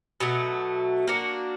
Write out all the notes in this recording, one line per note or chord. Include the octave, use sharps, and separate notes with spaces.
B2 F#3 A3
A#3 D4 F#4